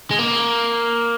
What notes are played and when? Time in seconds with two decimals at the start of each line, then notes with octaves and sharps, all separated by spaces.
0.11 G#3
0.19 A#3